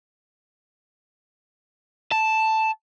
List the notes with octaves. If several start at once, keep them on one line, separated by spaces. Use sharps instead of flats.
A5